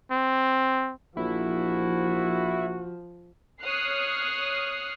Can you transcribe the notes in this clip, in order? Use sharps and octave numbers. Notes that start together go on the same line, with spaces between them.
C4
A#1 F3 E4 F#4
C#5 D#6 F6 F#6 C7